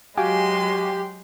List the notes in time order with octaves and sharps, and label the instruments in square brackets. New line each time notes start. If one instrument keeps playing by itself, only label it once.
[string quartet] F#3 G#3 C6 [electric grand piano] F#4 F5 G#5 [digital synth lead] G4